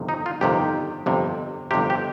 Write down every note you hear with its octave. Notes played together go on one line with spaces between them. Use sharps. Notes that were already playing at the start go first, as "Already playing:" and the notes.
Already playing: G1 F2 C3 D#3
D#4
F4
G1 F2 C3 D#3 G4
G1 F2 C3
G1 F2 C3 G4
G4